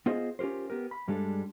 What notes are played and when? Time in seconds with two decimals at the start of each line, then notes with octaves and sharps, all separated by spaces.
0.06 B3 F4 G#4 C5 D#5
0.39 C#4 F4 G4 A#4 C5
0.70 B3 G4 A#4
0.91 B5
1.08 G2 G3 G#3 D4 A4